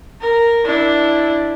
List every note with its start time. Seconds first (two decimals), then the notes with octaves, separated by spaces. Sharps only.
0.21 A#4
0.65 D4 E4